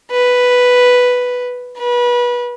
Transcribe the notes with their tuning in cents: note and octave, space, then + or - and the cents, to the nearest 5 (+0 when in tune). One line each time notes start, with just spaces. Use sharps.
B4 +0
B4 -30